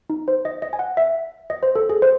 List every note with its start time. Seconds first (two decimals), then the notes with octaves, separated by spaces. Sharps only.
0.10 D#4
0.28 C5
0.45 D#5
0.62 D#5
0.73 G#5
0.79 F#5
0.97 E5
1.50 D#5
1.63 C5
1.76 A4
1.89 G#4
2.02 C5